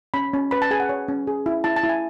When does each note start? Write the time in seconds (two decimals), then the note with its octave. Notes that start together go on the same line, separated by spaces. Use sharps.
0.14 C#4 B5
0.34 C#4
0.51 B4 B5
0.62 A5
0.71 G#4 G#5
0.80 F#5
0.89 C#5
1.08 C#4
1.27 G#4
1.46 E4
1.64 E4 A5
1.76 A5
1.84 E4
1.89 G#5